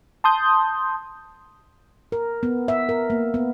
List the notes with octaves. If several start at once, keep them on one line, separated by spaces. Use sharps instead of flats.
A5 C6 D#6 G6
A#4
B3
E5
A#4
A#3
B3